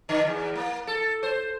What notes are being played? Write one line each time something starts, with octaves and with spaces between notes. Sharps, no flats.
D3
E2
A#3
A4
C5